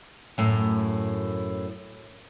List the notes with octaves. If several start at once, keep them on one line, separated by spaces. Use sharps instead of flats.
F#2 A2